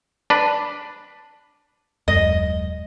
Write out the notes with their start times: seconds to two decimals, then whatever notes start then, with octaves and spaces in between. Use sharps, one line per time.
0.30 D4 B4
2.08 D#1 F#2 G#3 D#5